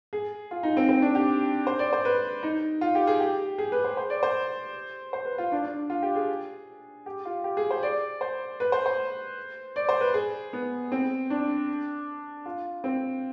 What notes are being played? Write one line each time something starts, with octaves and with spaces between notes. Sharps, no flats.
G#4
F4
D#4
C4
C4
D4
G4
C5
D5
C5
B4
D#4
F4
G4
G#4
G4
G#4
B4
C5
C5
D5
C5
C5
B4
F4
D4
D4
F4
G4
G#4
G4
F4
G4
G#4
C5
D5
C5
B4
C5
C5
D5
C5
B4
G#4
B3
C4
D4
F4
C4